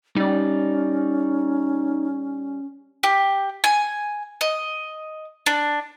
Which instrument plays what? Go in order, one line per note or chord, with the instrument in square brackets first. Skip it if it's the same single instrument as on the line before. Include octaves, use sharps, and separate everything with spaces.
[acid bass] G3 [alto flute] C#4 [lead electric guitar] D#4 D5
[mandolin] G4
G#5
D#5
D4